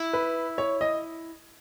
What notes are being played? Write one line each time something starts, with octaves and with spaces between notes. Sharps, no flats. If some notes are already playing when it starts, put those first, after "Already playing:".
Already playing: E4
B4
C#5
D#5